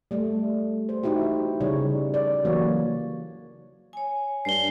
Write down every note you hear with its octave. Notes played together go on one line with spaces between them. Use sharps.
G3 A3
C5
D#4 E4 F#4 G4
C#3 G3 D#4 C#5
D5
E3 F#3 A#3 F#4 C#5
C#5 G#5
G2 C7 G7